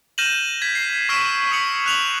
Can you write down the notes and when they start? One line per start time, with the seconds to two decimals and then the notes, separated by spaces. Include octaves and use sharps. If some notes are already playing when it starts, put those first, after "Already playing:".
0.18 F6 G6 A#6 D#7 E7 F#7
0.62 G#6 B6
0.75 C7
1.09 C#6 E6 F6 B6 D7 E7
1.51 C#6 D#6 B6 C#7 F#7
1.86 F#6 F7 F#7